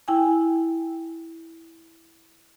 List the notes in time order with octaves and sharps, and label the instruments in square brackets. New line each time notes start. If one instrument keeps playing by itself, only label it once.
[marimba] E4 G5 G#5